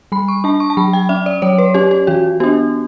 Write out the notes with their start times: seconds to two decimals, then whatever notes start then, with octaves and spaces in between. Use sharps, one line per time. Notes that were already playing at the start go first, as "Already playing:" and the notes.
0.12 G3 B5
0.28 C#6
0.44 D4 A5
0.60 C#6
0.70 A5
0.77 F#3 B5
0.93 G5
1.09 C#4 E5
1.26 D5
1.42 F#3 C#5
1.58 B4
1.74 C#4 G4
1.91 G4
2.07 E3 F#4
2.40 B3 D4 G4